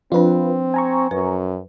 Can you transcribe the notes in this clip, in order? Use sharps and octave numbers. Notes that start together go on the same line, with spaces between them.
F3 C4 D4 F4 B4
G#5 A#5 C#6
F#2 B4